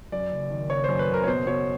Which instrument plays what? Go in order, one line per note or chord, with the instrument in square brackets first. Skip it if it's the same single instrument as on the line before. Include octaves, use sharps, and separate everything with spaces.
[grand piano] F#2 D5
F#1
D#3
F#1 C#5
F#2 C5
B4
F#1
A#4
C#5
B2 C5
B2 C#5